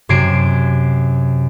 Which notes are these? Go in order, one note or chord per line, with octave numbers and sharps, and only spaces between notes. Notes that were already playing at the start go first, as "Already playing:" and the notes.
F#2 C3 G#6 C7 D7 E7